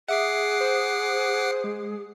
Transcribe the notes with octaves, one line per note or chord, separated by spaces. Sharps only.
G#4 E5 F#5 D6 C7
C5
G#3